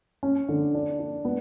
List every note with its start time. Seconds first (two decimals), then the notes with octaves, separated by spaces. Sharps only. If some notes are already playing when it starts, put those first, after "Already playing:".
0.23 C#4
0.49 D3
0.75 D4
0.99 D4
1.25 B3